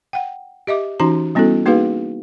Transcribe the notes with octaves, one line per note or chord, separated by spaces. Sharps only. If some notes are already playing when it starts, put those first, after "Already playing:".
F#5 G5
G4 D#5 E5 D6
E3 C#4 D#4 F#4 A#5
G3 B3 C#4 E4 F#4 A4
A#3 D#4 F#4 G#4 B4 F5